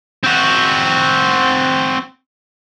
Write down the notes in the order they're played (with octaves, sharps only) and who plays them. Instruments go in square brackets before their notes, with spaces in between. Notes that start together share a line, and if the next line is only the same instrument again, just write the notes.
[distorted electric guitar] C4 F#4